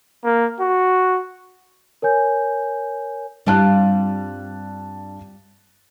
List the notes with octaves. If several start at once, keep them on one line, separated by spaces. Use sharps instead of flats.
A#3
F#4
A#4 C#5 G#5 G6
G2 G3 C4 F4 A5 F#6